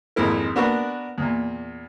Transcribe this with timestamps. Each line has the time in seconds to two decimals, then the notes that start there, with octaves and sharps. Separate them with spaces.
0.16 G#1 F2 G#3 E4 A#4
0.56 B3 D4 F#4 A#4 B4 C#6
1.18 E2 A#2